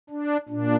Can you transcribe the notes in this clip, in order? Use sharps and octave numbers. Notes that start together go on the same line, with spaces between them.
D4
A#2 D4